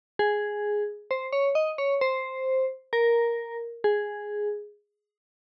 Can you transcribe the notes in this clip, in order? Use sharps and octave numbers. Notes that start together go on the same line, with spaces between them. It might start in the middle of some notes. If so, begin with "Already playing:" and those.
G#4
C5
C#5
D#5
C#5
C5
A#4
G#4